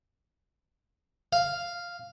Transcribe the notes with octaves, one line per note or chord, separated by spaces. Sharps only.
F5